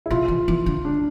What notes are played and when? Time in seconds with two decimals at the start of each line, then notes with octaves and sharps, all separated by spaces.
0.06 E4
0.10 C3 F4
0.28 E3
0.48 E3
0.66 D3
0.85 D4